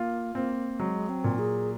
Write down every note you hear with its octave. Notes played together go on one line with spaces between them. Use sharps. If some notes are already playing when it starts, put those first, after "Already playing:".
Already playing: A#3 F4
A#3 C4
F#3 G#3
C4
A#2
G#4